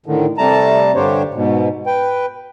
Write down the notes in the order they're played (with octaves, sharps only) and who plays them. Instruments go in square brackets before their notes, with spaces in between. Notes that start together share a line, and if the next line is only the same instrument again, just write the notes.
[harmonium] A2 D3 D#3
C3 G3 A3 A5 A#5
G2 D3 D4 G4 C5 C#5
G#2 B2
B4 G5